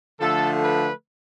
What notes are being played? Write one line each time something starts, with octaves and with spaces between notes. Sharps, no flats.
D3 F3 A3 A4
B4